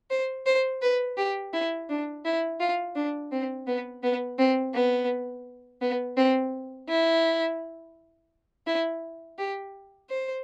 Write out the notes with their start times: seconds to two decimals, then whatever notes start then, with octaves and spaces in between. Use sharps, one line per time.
0.10 C5
0.46 C5
0.82 B4
1.17 G4
1.53 E4
1.89 D4
2.25 E4
2.60 F4
2.96 D4
3.32 C4
3.67 B3
4.03 B3
4.39 C4
4.74 B3
5.81 B3
6.17 C4
6.88 E4
8.67 E4
9.39 G4
10.10 C5